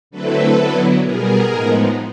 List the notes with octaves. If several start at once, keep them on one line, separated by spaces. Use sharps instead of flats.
D3 F#3 A3 C4 E4 A4 B4
D3 F#3 B3 E4
B2 G3 B3 G#4 A#4
A2 F3 G#3 B3 D#4